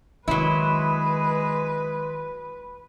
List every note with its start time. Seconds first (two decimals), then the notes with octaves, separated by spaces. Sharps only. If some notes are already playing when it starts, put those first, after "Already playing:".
0.28 D#3 F#3 G#3 E4 B4